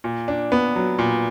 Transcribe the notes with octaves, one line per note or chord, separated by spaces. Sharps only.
A#2
D4
B3
F#3
A#2